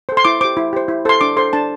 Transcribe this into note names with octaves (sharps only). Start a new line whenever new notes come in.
A4 C5
C6
E4 D6
G4 C5 D6
E4
G4 C5
E4
A4 C5 C6
D4 D6
A4 C5 C6
D4 A5